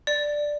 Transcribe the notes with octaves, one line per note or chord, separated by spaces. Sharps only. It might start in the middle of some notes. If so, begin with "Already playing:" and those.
D5